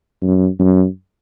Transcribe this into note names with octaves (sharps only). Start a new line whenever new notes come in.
F#2
F#2